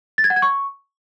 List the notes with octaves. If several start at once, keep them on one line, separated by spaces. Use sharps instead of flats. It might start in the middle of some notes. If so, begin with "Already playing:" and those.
A6
G#6
F#5
G#6
C#6